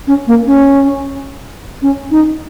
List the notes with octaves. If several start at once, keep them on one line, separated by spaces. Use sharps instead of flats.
C#4
A#3
C#4
C#4
D#4